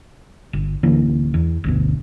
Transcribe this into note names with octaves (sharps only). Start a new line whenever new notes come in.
G1
D1 D3 E3 A#3
E2
G1 D2 B2